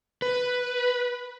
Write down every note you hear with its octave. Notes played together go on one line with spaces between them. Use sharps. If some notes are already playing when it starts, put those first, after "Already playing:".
B4